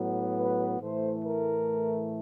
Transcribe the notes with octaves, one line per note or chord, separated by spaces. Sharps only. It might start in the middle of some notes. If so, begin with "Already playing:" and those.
Already playing: A2 F#3 B3
B4
A2 E3 A3 C5
A#4